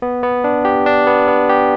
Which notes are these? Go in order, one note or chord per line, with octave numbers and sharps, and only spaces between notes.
B3
B3
D4
G4
D4
B3
B3
G4